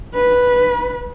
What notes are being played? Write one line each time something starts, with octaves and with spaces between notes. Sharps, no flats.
B4